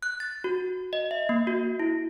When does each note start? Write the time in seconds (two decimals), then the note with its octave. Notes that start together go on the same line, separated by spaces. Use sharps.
0.03 F#6
0.20 A6
0.44 F#4
0.93 D#5
1.11 E5
1.29 A#3
1.47 F#4
1.80 E4